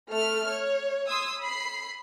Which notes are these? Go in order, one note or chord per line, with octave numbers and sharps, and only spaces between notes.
A3 A4 F6
C#5
C6 D#6 E6 G#6
B5 C7